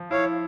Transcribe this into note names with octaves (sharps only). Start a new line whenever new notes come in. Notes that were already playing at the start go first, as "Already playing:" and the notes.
Already playing: F3
E4 C#5 F5